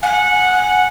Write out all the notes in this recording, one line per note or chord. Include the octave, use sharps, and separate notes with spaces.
F#5 G#5